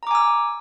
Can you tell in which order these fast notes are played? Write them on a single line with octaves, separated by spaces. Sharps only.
A#5 D6 G#5 E6